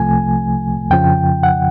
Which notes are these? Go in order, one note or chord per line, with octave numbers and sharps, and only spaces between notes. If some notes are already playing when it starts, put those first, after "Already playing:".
Already playing: C2 C3 F3 A3 G#5
F2 C#3 F3 G5
F#5